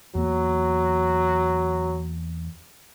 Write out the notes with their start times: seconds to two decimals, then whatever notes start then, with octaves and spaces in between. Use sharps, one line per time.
0.15 E2 F#3 A#3